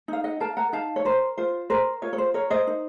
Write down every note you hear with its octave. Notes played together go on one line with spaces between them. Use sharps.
D#4 F5
D#5 F#5
A#4 F5 A5
F#5 A#5
D#4 F5 A5
C#5
A#4 C5
F4 C5
A#4 C5
F4 C#5
C#5
C5
A#4 C#5
C5 D#5
D#4